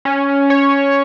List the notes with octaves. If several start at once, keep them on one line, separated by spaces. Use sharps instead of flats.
C#4
C#5